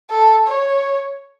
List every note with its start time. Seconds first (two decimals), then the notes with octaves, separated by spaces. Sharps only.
0.10 A4
0.47 C#5